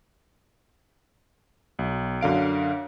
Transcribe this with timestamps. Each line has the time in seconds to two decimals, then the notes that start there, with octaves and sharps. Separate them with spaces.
1.79 B1
2.21 F#2 D3 F5 D7